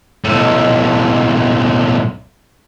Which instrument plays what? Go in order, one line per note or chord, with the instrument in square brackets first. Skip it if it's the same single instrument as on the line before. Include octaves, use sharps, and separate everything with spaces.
[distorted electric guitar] B1 A2